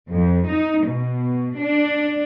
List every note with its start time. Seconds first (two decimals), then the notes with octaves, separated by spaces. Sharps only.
0.11 F2
0.50 D#4
0.87 B2
1.59 D4